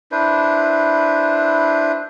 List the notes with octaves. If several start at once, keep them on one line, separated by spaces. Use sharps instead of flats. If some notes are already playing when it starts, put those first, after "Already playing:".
D4 E4 B4 C5